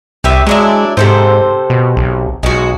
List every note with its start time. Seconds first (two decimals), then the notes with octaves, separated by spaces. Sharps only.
0.24 C2 G4 B4 E5
0.47 F#3 G#3 D4 E4
0.97 G#2 C3 A4 C5
1.70 B2
1.97 B1
2.43 B1 G#3 F#4